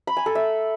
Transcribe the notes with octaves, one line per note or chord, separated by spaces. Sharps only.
B5
G#5
A4
E5